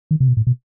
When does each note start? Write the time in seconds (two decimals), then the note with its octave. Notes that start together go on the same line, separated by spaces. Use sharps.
0.11 D#3
0.20 C3
0.28 B2
0.37 A2
0.47 B2